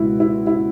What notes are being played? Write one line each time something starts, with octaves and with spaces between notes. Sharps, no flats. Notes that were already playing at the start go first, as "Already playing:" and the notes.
Already playing: C#2 B2 G#3 E4 F#4
E4
E4